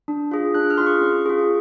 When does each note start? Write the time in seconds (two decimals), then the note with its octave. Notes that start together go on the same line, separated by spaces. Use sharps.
0.08 D4
0.31 F4 G#4
0.54 D4 F#6
0.70 F6
0.78 F4 G#4 C6
0.86 C#6
1.01 C#4
1.26 F4 G#4
1.39 C#6